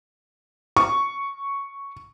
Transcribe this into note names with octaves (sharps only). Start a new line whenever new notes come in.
C#6